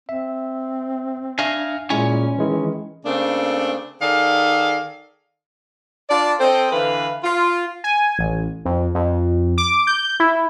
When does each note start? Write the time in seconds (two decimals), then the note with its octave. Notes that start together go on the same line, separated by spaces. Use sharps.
0.09 C4 E5
1.39 D4 E5 F5 G#5 A#6
1.90 A#2 G#3 C#4 E4 G#5
2.38 D#3 E3 G#3 E4
3.06 C#3 A3 A#3 C4 D4
4.01 D#3 G#4 A4 D5 F5
6.09 D4 F4 D5
6.40 C4 A4 C5 D#5 G5
6.72 D3 E3 B4 F5
7.24 F4
7.84 G#5
8.19 A1
8.65 F2
8.95 F2
9.58 D6
9.87 G6
10.20 E4